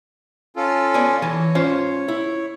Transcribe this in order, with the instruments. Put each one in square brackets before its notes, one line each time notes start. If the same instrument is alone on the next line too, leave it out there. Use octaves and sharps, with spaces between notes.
[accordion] C#4 F4 A4
[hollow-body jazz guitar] B3 D5 G#5
[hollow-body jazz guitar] E3 G#5 A5 [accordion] C#5
[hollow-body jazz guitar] C#4 F4 C5
E4